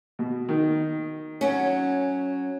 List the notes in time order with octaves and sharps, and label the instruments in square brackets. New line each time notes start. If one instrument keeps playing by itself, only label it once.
[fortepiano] B2
D#3
[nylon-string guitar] F#3 C#4